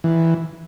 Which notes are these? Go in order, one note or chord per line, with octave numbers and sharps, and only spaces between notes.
E3